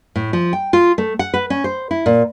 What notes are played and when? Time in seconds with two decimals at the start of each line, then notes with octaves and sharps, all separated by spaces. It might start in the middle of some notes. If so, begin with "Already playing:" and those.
0.16 A2
0.33 F3
0.53 G5
0.73 F4
0.98 A3
1.19 F#5
1.34 B4
1.50 C#4
1.64 C5
1.91 E4
2.06 A#2